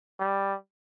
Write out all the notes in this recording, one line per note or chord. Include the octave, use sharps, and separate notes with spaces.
G3